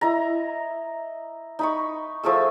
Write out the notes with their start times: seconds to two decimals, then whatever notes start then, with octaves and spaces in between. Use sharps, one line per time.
0.01 E4 D#5 A#5
1.59 D#4 B5 C#6
2.23 F3 A3 G#4 E6